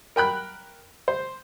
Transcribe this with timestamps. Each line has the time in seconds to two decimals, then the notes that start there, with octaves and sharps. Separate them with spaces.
0.16 A#4 G5 B5 F#6
1.08 C5